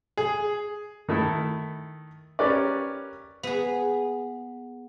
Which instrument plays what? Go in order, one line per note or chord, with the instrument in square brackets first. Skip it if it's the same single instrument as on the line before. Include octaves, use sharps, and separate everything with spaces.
[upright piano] G#4
[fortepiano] D#3 A3 E4
C#4 G4 A#4 B4 D5
[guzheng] B3 G#4